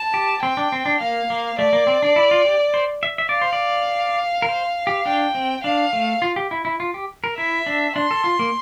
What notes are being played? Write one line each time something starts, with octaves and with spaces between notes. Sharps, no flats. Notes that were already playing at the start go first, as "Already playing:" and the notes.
Already playing: A5
G4
C4 G5
D4
C4
D4
A#3 F5
A#3
A3 D5
A#3
C4
D4
E4
F4
G4
C5
E5
E5
D5 F5
C5
D5
A#4
C5
G4
D4 G5
C4
D4 F5
A3
F4
G4
E4
E4
F4
G4
A#4
E4 E5
D4
D4 C6
A4
F4
A#3